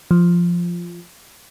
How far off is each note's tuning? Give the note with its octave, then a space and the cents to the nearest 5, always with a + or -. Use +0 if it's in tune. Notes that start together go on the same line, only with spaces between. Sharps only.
F3 -5